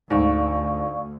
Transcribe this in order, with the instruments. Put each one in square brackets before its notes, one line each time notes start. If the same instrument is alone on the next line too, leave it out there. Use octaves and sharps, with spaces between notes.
[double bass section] D2 [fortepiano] G#2 [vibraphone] D5 F5 C#6